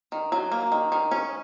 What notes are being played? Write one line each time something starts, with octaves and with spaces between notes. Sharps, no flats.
D#3
F#3
A#3
D#3
D#3
C#4